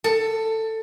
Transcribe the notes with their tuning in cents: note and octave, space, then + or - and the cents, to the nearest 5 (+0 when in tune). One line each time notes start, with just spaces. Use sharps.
A4 +15